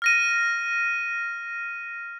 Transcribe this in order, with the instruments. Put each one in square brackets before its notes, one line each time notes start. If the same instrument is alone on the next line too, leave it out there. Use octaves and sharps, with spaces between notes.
[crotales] F6 A#6 D#7